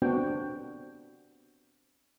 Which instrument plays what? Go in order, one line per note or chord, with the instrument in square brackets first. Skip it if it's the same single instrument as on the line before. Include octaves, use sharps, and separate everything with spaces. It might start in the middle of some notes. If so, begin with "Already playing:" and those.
[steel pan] B3 C4 D4 F#4 G5